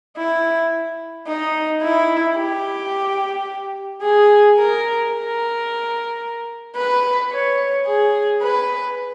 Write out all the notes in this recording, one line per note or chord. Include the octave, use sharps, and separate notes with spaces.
E4
D#4
E4
G4
G#4
A#4
A#4
B4
C#5
G#4
B4